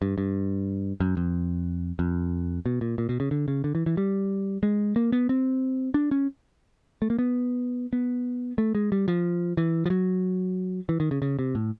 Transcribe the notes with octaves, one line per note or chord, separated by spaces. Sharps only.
G2
G2
F#2
F2
F2
B2
A#2
A#2
B2
C#3
D3
C#3
D3
E3
E3
G3
G#3
A#3
B3
C4
D4
C#4
A3
A#3
B3
B3
A3
G#3
G3
F3
E3
F3
F#3
E3
D#3
C#3
C#3
C3
A2